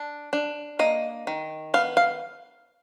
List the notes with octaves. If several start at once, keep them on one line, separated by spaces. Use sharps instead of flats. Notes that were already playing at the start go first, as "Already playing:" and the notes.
Already playing: D4
D4
A#3 D#5
D#3
B3 F5
F5